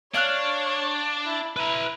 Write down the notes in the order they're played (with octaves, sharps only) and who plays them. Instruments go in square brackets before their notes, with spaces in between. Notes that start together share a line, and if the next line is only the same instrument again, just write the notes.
[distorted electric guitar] D4 [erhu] C#5 [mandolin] D5 F5 F#6
[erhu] E4
[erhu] E4 [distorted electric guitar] B4 A#5